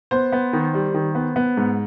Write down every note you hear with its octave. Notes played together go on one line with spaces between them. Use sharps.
B3 C5
B3
D#3
G3
D#3
B3
B3
G#2